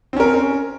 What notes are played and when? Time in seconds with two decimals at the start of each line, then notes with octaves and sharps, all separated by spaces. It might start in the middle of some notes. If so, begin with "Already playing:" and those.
0.13 C4
0.16 C#4
0.20 A#4